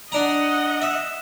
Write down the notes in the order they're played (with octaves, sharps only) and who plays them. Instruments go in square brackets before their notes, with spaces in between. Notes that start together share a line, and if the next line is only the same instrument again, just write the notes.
[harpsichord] D4 A#5 [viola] D#5 F#5
[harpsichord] E5